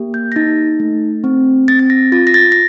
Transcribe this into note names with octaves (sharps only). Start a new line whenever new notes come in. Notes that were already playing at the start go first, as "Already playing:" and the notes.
Already playing: A#3 G4
G6
A#6
D#4 A6
A3
C4
C4 A6
A6
A#6
F4 A6
A#6
A6
A#6